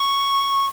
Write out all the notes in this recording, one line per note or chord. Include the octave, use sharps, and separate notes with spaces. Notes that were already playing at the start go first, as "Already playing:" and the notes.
Already playing: C#6